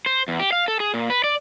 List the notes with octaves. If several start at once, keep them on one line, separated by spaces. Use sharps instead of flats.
C5
E2
G4
F5
A4
G#4
A#2
B4
D5